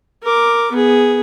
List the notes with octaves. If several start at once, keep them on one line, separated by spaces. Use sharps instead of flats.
A#4 D6
B3 G#4